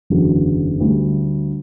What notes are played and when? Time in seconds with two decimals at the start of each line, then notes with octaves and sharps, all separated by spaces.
0.10 F#1 E2 D3 F#3
0.80 D2 D3 G3